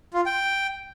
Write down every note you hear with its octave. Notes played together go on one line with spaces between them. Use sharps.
F4
G5